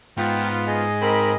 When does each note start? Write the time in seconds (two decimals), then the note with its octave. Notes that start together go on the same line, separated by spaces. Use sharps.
0.17 G#2 B3 F4 G5
0.67 G#4 D#5
1.02 C4 D#4 A#4 B5